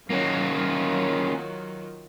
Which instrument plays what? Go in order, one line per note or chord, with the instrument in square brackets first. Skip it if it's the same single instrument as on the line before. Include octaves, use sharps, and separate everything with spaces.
[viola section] D#3 F#3 F4 [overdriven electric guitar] A#3 C#4